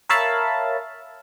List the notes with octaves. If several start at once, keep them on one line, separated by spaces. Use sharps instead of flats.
A#4 C#5 E5 F5 A5 B5